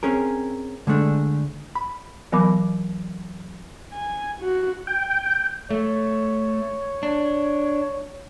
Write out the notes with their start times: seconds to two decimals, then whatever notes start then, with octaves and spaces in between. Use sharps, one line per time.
0.03 C4 C#4 G#4 A#4
0.87 D3 G#3 A3 D4
1.75 B5
2.32 E3 F#3 B3 A#4 B5 D6
3.93 G#5
4.41 F#4
4.87 G5
5.71 A3 C#5
7.03 D4